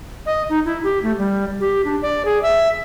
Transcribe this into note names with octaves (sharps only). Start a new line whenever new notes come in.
D#5
D#4
E4
G4
A3
G3
G4
D4
D5
G#4
E5